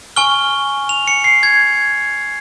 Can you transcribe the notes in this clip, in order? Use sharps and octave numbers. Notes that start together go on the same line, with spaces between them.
G#5 C#6 F6 G7
F7
C#7
C7
G#6